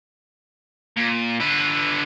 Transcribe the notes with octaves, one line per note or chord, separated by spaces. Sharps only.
A#2
D3 B4